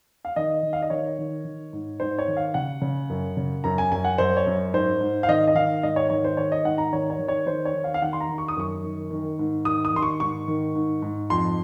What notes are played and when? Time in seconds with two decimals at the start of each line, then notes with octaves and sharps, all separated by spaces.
0.25 F5
0.36 D#3 D#5
0.63 D#3
0.73 F5
0.82 D#5
0.90 D#3 C#5
1.18 D#3
1.45 D#3
1.73 G#2
2.00 G#2 C5
2.19 C#5
2.28 D#3
2.37 F5
2.54 C#3 F#5
2.81 C#3
3.10 F#2
3.37 C#3
3.64 F#2 A#5
3.78 G#5
3.92 F#2 G#5
4.04 F#5
4.18 F#2 C5
4.37 C#5
4.47 F#2
4.73 G#2 C5
5.01 G#2
5.23 F5
5.28 D#3 D#5
5.47 D#5
5.55 D#3 F5
5.83 G#2 D#5
5.96 C#5
6.10 D#3 C#5
6.24 C5
6.37 D#3 C#5
6.52 D#5
6.65 G#2 F#5
6.78 A#5
6.92 D#3 C#5
7.10 C#5
7.19 D#3
7.28 C#5
7.46 D#3 C5
7.65 C#5
7.74 D#3
7.84 F5
7.94 F5
8.02 D#3 F#5
8.13 C6
8.21 A#5
8.29 D#3
8.38 C#6
8.48 D#6
8.57 F#2 C#6
8.84 D#3
9.10 D#3
9.39 G#2
9.65 D#3 D#6
9.85 D#6
9.93 D#3 C6
10.02 C#6
10.20 G#2 C#6
10.48 D#3
10.75 G#2
11.02 G#2
11.30 F2 C6